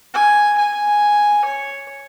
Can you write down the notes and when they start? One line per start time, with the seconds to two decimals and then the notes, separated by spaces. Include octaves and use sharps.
0.14 G#5
0.58 G#5
1.45 C#5